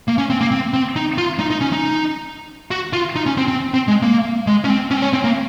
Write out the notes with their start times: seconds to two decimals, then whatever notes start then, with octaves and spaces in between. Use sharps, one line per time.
0.08 A#3
0.18 C#4
0.30 C4
0.41 A#3
0.51 C4
0.73 C4
0.96 D#4
1.18 F4
1.40 D#4
1.50 D#4
1.61 C#4
1.72 D#4
2.71 F#4
2.93 F4
3.15 D#4
3.26 C#4
3.37 C4
3.48 C4
3.74 C4
3.88 G#3
4.02 A#3
4.47 G#3
4.64 C#4
4.69 C4
4.91 C#4
4.97 C4
5.02 C#4
5.13 C4
5.24 A#3